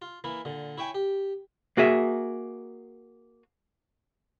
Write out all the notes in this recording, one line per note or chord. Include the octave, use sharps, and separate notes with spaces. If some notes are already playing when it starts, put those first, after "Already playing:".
F4
E3 A#3 E4
A#2 D3
E4 C#5 E5 G5 G#5
G4
A#3 F#4 G#4 E5